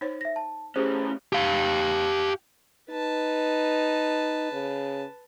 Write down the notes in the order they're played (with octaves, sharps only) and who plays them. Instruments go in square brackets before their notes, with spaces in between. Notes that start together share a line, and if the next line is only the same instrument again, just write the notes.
[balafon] D#4 C5 C#5
[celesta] E5 A#6
A5
[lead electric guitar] A2 C#4 [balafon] G4 [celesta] G#4 C5
[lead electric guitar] G4 F5
[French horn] D#4 [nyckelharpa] B4 A5
[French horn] C#3